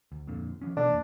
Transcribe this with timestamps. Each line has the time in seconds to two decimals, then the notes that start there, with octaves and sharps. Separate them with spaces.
0.12 D2
0.27 F2 A#2 D3
0.62 E3 F3 C#4
0.77 B2 E3 B3 D4
0.89 E2 A#3